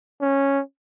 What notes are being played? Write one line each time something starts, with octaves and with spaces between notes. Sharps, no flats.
C#4